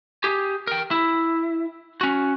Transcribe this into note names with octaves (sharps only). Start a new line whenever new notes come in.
G4 G#4
A#4 G5
E4
C#4 F#4